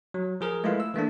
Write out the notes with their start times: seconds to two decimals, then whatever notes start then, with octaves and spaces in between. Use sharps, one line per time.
0.14 F#3
0.41 F3 G#4 A#4
0.64 G#3 A3 E4 F4 B4 F5
0.80 E6
0.94 E3 A3 A#3 D4